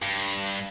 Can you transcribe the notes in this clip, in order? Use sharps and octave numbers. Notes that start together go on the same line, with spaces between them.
G2